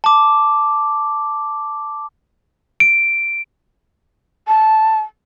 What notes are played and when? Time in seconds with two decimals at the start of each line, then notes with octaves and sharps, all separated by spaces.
0.04 A5 D6
2.80 D7
4.48 A5